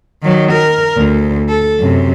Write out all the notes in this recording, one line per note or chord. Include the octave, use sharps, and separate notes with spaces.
D#3 F#3
A#4
D2
A4
F#2 C3